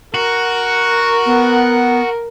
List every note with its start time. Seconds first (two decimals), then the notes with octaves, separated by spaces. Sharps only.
0.14 F#4 A#4
1.26 B3